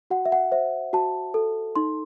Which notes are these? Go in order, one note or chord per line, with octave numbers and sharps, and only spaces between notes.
F#4 F#5
E5
F#5
C5 E5
F#4 A5
A4
D#4 C6